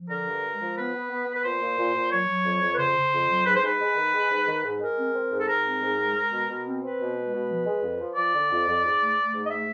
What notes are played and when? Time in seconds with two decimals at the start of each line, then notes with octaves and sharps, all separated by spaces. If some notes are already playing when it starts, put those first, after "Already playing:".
Already playing: F3
0.09 D3 A#4
0.26 G2
0.42 G#3
0.60 F3
0.76 B3 B4
0.94 B3
1.10 B3
1.26 B3
1.35 B4
1.43 A#2 C5
1.61 A#2
1.77 A#2
1.94 A#2
2.11 F#3 C#5
2.28 F#3
2.45 F2
2.62 F2
2.73 B4
2.78 C#3 C5
2.95 C#3
3.12 F2
3.29 F#3
3.45 G#2 B4
3.55 C5
3.62 G#2 B4
3.79 G#3
3.96 D#3
4.13 G#3
4.30 G#2
4.46 D#3
4.64 G#2
4.80 G#3 A#4
4.97 C4
5.13 C4
5.30 G#2
5.39 A4
5.47 G#2 A#4
5.64 C4
5.81 G#2
5.98 G#3
6.14 G#3
6.31 B2
6.48 B2
6.66 C4
6.82 C4 B4
6.99 B2
7.16 G#3
7.32 B2
7.50 F3
7.65 G#3
7.83 F2
7.99 F3
8.16 F3 D5
8.33 D3
8.50 F2
8.67 F2
8.84 G#2
9.00 A3
9.17 A3
9.34 G#2
9.46 D#5
9.50 A3 E5